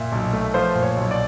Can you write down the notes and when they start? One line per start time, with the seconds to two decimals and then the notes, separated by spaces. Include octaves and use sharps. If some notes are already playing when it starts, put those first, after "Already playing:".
Already playing: A#2 E5
0.12 B1
0.33 A3
0.54 F3 C5
0.75 A#2
0.83 C#5
0.97 B1
1.11 D5